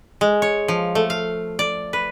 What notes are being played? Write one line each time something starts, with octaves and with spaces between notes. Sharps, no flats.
G#3
C#5
F3
A3
F5
D5
B4